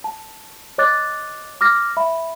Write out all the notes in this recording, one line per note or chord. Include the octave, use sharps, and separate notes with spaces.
A5
C#5 D#5 D6 F#6 A6
D6 F6 A#6
E5 B5